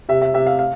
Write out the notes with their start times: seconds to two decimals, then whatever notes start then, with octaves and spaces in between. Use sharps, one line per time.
0.09 C3 E5
0.22 E5
0.34 C3 E5
0.47 F5
0.59 F5